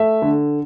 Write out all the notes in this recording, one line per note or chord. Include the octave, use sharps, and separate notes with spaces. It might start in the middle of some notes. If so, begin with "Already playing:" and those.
Already playing: A3 E5
D3